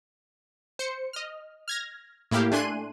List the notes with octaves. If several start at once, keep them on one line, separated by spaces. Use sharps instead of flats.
C5 C#7
D#5 F6
F6 G#6 A#6
A2 A#3 E4 G4 F5
A3 D4 G#5 C6 F#6 D#7